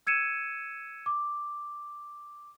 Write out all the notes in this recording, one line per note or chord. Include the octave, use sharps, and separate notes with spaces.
E6 G#6 C#7 D#7 E7
D6